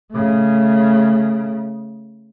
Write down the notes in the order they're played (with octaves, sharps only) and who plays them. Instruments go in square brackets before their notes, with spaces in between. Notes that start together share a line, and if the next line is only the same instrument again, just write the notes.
[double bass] C#3 A3